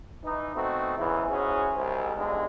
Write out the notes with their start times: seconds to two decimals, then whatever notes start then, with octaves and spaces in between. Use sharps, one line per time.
0.24 E3 D#4
0.56 A3 B3 C4 D#4 F#4
0.98 E2 G#2 C#3 E3
1.30 G#2 C#4 E4 F#4 G#4
1.75 C2 G#2
2.17 B1 E2 G2 D3 G#3